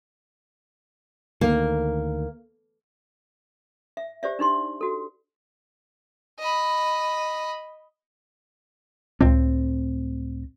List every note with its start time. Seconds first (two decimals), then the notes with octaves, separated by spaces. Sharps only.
1.41 D2 D#3 A#3
3.97 E5
4.23 G4 C5 D5 E5
4.39 D4 D#4 G4 C6
4.81 F#4 A4
6.39 D#5 B5
9.21 C#2 A2 C4